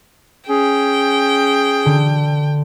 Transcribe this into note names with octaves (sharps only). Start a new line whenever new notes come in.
C#4 G#4 G5
D3